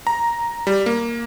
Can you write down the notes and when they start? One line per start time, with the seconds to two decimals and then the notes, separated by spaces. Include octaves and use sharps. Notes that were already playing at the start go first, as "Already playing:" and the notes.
0.07 A#5
0.67 G3
0.86 A#3